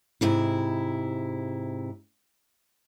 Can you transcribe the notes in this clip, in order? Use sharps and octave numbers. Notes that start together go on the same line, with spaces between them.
G#2 C3 E4